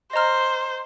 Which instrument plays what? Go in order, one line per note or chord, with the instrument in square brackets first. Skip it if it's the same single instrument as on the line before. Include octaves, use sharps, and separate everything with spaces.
[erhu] C5 [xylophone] D#5 A#5 F6